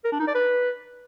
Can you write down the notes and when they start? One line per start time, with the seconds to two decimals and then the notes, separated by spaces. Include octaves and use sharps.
0.04 A#4
0.12 D4
0.19 D#4
0.27 D5
0.35 B4